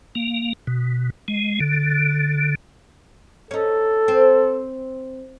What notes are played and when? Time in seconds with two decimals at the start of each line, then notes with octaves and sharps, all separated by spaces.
0.15 A#3
0.67 B2
1.28 G#3
1.60 D3
3.51 C#4 D#4 A4
4.08 C4